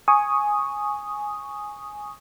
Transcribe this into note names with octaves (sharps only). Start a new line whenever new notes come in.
G#5 C#6 D#6